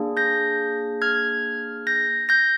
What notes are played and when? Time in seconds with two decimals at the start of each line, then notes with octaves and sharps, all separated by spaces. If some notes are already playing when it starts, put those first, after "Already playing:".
Already playing: A#3 D4 G#4
0.17 G6 A#6
1.02 F6 G#6
1.87 G6 A#6
2.29 G6 A#6